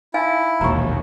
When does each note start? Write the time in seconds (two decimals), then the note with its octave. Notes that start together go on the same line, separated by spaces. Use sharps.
0.14 D#4 E4 F5 G#5
0.61 E1 A#1 D#2 A#5 C#6